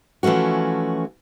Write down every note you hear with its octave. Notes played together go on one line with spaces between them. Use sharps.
E3 F3 A3 C#4 F#4